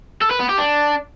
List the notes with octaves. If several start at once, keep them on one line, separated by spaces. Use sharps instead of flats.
A4
B4
B3
G4
D4